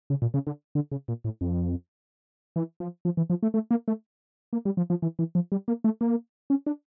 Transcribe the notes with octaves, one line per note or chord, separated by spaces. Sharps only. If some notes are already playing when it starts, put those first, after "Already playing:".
C#3
A#2
C#3
D3
D3
C#3
A#2
A2
F2
E3
F3
F3
E3
F3
A3
A3
A#3
A3
A#3
G3
F3
F3
E3
E3
F3
G3
A#3
A3
A#3
C#4
D4